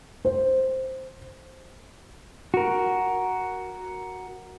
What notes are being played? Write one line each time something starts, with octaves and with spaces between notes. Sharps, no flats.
C5
F#4 A#4